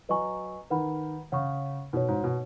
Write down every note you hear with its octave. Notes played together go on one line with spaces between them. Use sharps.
F#3 B4 D#5 G#5 C#6
D#3 B4 F#5 B5
C#3 C#5 F#5 C#6
B2 D#4 F#4 C#5
G#2
B2